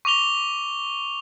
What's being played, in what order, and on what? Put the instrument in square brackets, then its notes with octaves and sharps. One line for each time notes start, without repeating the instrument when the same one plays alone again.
[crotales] C#6 D6 F7 G7